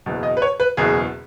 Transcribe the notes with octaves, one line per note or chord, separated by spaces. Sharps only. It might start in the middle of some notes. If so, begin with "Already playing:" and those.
F#1 E2 B2
D#5
B4
C#5
B4
F#1 E2 B2 G#4